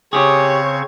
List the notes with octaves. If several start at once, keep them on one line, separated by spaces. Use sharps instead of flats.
C#3 C4 G4 G#4 C#5 C#6